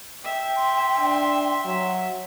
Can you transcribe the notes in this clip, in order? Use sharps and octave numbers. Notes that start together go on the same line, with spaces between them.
E5 G5
C6
D4
F#3